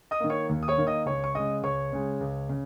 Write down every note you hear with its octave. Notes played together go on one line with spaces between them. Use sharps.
D#5 D#6
D#3 A#3
C#5 C#6
D#2
D#6
C#5 C#6
D#3 A#3
D#5 D#6
C#2 C#5 C#6
C#6
C#3 G#3 D#5 D#6
C#2 C#5 C#6
C#3 G#3
C#2
C#3